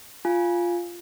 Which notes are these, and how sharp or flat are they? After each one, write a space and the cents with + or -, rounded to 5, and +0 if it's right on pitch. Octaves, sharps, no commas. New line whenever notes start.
F4 -5 G#5 +0